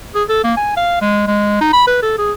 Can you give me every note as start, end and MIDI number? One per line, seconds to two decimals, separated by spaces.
0.15 0.24 68
0.29 0.42 69
0.44 0.53 58
0.57 0.74 80
0.77 0.98 77
1.01 1.27 56
1.27 1.60 56
1.61 1.73 63
1.73 1.85 83
1.87 2.00 71
2.03 2.14 69
2.18 2.32 68